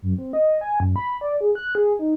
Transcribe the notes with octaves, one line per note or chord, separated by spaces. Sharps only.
F#2
C4
D#5
G#5
F#2
B5
D5
G#4
F#6
G#4
D#4